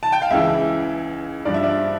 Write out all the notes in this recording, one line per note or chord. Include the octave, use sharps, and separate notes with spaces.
A5
G5
F5
C#2 C#3 E3 E5
G2 F3 D5
E5
D5